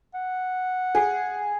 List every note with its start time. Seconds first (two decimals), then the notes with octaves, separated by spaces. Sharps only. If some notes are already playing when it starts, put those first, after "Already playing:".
0.14 F#5
0.95 G#4